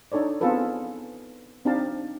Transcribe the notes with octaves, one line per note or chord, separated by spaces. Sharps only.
D4 D#4 A4 C#5 D5
B3 C4 F4 G#4 A4 B4
C4 D4 D#4 G4 F5 A5